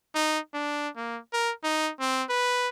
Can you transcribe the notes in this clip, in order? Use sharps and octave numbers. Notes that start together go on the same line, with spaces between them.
D#4
D4
A#3
A#4
D#4
C4
B4